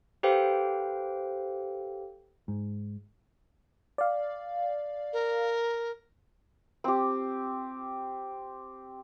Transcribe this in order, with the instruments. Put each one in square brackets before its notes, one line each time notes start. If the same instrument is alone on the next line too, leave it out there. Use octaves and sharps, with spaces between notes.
[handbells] G4 A4 B4 C5 F5 G5
[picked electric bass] G#2
[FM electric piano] D5 F5
[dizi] A#4
[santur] C4 G4